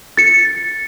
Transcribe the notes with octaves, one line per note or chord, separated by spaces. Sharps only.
A6 C#7